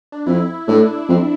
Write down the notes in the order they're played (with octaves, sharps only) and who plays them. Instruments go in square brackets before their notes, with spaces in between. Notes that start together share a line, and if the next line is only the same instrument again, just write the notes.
[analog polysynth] D4
[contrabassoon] F2 [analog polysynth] E4
[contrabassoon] A2 [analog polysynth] D4
[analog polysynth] D4
[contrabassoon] F2